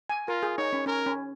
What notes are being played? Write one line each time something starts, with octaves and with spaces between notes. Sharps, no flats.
G#5
F4 A#4
G#4
D#4 C#5
C#4
C#4 A#4
C#4